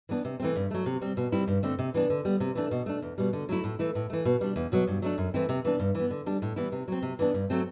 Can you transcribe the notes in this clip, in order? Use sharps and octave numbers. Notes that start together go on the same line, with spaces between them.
E3 B3 D4
C3
E3 A3 C4
G2
F#3 A3
C3
G3 C4
B2
G3 C4 E4
G2
D3 A3 C4
C3
E3 B3 D4
D3
G3 B3
C3
E3 A3 D4
B2
A3 D4
E2
B2 G3
D3
F#3 A3 E4
A2
E3 A3 E4
A2
E3 A3
B2
G3 D4
E2
B2 F#3 B3
G2
F#3 A3 D4
F#2
E3 A3 C4 E4
C3
E3 B3 D4
G2
E3
B3
D3
G3 D4
A2
E3 G3 B3 E4
C3
F#3 C4
C3
E3 B3 D4
G2
F#3 A3 C4